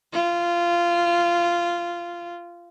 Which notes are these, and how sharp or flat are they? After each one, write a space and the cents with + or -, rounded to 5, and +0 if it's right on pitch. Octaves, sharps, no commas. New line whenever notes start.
F4 -15